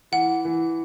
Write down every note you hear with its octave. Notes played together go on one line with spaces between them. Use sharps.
E3 F#5
E3